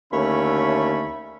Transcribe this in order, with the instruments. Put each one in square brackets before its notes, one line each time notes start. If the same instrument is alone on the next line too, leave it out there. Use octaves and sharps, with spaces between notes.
[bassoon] D#2 [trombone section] D3 A3 C#4 [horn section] C#5 E5 B5